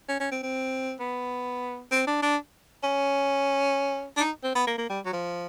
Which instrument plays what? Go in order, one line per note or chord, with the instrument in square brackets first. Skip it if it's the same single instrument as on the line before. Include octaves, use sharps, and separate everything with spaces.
[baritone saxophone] C#4
C#4
C4
C4
B3
C4
D4
D4
C#4
D4
D#4
C4
B3
A#3
A#3
G3
F#3
F3